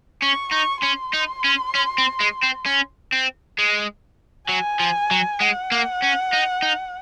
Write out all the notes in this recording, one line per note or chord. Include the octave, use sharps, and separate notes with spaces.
C#4 C#6
D#4 C#6
C#4 C6
D#4
C#4
C#4
C4
G#3
C4
C#4
C4
G#3
F#3 G#5
F3
F#3
G#3 F#5
A#3
C#4
D#4
D#4